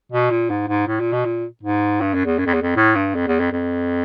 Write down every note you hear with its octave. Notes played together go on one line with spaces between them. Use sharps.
B2
A#2
G#2
G#2
A2
A#2
B2
A#2
G#2
G2
F#2
E2
F#2
F2
E2
F2
A2
G2
F2
E2
F2
F2